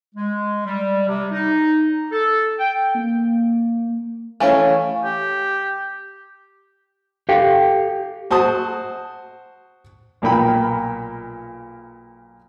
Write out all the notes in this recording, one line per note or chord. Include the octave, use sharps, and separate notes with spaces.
G#3
G3
C3
D#4
A4
G5
A#3
E3 A3 C#4 F5
G4
G4 A4 F5 G5
F#4 C5 A5 D#6
B1 A#2 A#3 G5 B5